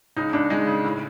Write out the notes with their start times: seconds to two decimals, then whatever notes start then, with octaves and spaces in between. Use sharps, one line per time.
0.17 C#2 D#4
0.33 C#2 D4
0.50 G#3 D#4
0.67 C#3
0.84 A2